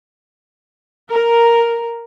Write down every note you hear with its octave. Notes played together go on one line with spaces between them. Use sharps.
A#4